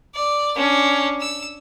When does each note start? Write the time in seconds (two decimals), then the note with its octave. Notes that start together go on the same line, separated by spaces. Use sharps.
0.15 D5
0.56 C#4 D4
1.21 E6